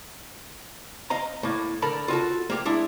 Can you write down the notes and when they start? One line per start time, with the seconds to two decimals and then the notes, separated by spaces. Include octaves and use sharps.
1.10 D#5 F5 A#5
1.43 A2 A#3
1.82 D3 A4 A#4 B5
2.08 F4 F#4 A4
2.50 A#3 G4
2.65 G#3 D4 E4